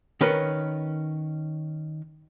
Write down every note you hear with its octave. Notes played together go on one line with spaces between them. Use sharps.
D#3 C#4 A#4 B4